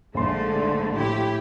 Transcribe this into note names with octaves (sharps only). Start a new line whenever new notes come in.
A#1 G#2 D3 A3 C6
A2 E4 G4